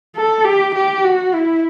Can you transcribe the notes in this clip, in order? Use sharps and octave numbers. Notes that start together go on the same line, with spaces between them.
A4
G4
G4
F#4
E4